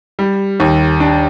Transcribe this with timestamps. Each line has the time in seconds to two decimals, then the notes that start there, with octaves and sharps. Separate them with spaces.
0.19 G3
0.60 D#2
1.00 D4